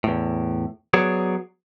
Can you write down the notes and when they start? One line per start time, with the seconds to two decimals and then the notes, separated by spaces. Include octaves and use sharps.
0.04 E2 A2
0.93 F#3 B3 G#4 C#5 D5